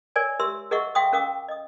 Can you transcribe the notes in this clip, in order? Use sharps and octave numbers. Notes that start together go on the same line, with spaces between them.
A#4 C#5 D5 G#5
G4 A#4 E5 C6 E6
G#4 A#4 D#5 E5 F#5 C#6
E5 F5 G5 C6 C#6 D#6
C#4 A#4 F5 D6 D#6
D#5 D#6